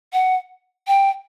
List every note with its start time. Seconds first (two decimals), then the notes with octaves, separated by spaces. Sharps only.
0.13 F#5
0.87 G5